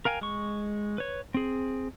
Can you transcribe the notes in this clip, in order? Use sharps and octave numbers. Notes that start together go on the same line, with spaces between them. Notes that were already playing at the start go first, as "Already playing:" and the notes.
A#4 F5 G5 G#5
G#3 C#6
B4 C#5
C4 G#4